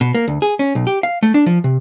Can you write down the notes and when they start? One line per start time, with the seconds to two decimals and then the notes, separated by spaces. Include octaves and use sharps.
0.01 B2
0.15 A#3
0.28 D2
0.42 G#4
0.59 C#4
0.75 B1
0.87 G4
1.03 F5
1.23 A3
1.34 D4
1.46 F3
1.64 C3